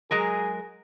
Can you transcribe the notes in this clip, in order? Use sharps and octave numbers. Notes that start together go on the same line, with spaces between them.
F#3 G#3 G#4 A#4